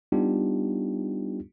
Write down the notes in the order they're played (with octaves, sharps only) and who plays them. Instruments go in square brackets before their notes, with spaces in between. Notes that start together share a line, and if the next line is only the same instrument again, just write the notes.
[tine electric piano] G3 B3 D4 D#4 F4 G4